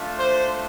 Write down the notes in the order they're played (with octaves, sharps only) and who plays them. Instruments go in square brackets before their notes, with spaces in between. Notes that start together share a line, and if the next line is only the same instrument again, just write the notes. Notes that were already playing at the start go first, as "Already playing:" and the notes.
Already playing: [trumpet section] A3 D4 F4
C5